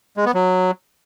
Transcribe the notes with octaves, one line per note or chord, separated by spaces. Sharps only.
G#3
B3
F#3